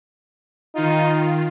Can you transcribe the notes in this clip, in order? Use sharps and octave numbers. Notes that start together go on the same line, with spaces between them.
D#3 D#4 F4